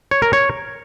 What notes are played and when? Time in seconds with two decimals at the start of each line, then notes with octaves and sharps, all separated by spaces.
0.11 C#5
0.22 A#4
0.33 C#5